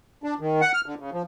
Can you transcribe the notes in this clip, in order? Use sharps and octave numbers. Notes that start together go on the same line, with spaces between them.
D4
D#3
F#5
F6
D3
C#3
F3